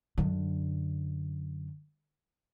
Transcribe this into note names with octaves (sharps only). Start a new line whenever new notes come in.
F#2 D3